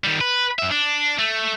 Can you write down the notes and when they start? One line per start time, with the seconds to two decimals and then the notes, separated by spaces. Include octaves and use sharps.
0.04 D#3 G3
0.21 B4
0.59 F#2 E5
0.71 D4
1.19 A3